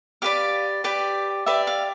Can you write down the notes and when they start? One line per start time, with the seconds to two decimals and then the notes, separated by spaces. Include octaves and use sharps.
0.22 G4 B4 D5 F5
0.84 G4 B4 D5 G5
1.46 G4 B4 D5 E5
1.67 F5